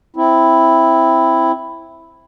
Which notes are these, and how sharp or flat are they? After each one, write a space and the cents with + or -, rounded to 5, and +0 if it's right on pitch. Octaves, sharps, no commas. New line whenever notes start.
C4 +0 E4 +0